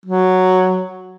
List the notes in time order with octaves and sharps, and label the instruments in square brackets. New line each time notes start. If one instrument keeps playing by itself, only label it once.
[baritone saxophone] F#3